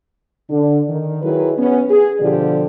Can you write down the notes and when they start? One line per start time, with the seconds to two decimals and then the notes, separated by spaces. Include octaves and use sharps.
0.50 D3 D4
0.88 D#3
1.22 D#3 F#3 E4 G#4 B4
1.58 B3 C#4
1.90 G#4
2.20 B2 D3 F3 G4 D5